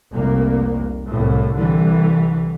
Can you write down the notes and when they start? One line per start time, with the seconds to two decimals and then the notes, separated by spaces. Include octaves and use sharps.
0.11 F1 C2 A#3
1.09 C2 A2
1.57 C2 D3 E3 G3